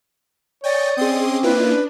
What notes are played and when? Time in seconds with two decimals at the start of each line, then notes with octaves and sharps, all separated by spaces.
0.64 C#5 D5 G5 G#5 D#6 G6 A#6 C#7
0.97 C4 C#4 G#4 D#5 C6 D6 D#6
1.43 A#3 D4 E4 F4 B4